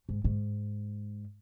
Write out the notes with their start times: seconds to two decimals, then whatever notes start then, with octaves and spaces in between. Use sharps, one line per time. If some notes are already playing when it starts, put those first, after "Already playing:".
0.09 G#2
0.24 G#2